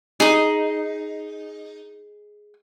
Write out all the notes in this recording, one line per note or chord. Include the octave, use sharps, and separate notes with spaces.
D#4 G#4 D#6